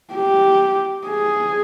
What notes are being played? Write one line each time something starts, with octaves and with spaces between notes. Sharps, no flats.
G4
G#4